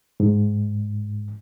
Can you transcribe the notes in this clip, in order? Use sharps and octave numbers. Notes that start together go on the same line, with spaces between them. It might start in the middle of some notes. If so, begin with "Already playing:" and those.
G#2